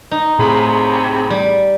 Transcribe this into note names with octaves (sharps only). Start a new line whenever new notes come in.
D#4
A2 C3 G#4 B5
G3